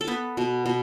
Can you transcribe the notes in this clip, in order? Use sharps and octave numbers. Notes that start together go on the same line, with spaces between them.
A4
B3 B4
B2
B2